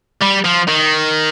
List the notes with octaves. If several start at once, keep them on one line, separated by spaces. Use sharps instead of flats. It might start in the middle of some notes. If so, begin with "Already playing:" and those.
G3
F3
D#3